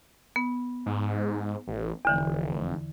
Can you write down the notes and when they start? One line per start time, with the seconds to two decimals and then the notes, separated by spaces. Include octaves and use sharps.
0.36 B3
0.86 G#2
1.67 A1
2.05 F1 E2 D3 E3